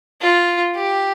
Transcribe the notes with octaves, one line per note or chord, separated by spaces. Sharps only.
F4
G4